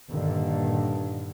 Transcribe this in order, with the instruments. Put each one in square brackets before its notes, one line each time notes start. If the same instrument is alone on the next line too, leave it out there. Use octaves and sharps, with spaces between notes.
[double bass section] G2 A#2 D3 D#3